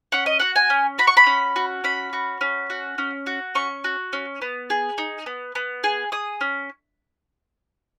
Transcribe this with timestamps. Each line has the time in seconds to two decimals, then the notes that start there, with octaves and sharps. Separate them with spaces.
0.12 C#4 F#5
0.26 D#5
0.40 F#4 F#5
0.56 G#5
0.70 C#4
0.98 F#4 B5
1.07 C#6
1.17 B5
1.27 C#4
1.56 F#4
1.84 C#4 B5
2.13 F#4
2.41 C#4
2.70 F#4
2.98 C#4
3.26 F#4
3.55 C#4 C#6
3.84 F#4
4.13 C#4
4.42 B3
4.70 G#4
4.98 D#4
5.26 B3
5.55 B3
5.84 G#4
6.12 G#4 D#6
6.41 C#4